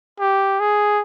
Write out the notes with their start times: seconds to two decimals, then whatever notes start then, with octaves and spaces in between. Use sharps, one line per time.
0.20 G4
0.60 G#4